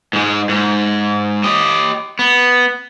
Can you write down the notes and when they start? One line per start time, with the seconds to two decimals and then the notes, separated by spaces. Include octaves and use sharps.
0.13 G#2 G#3
0.49 G#2
1.44 G4 D#5
2.19 B3